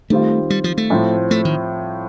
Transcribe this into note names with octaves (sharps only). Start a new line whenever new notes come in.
D#3 G3 A3 C4 F4
G3
F3
A3
A2 F3 C4
A3
D#3